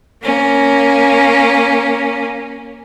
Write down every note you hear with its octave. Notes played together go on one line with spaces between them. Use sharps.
A#3 C#4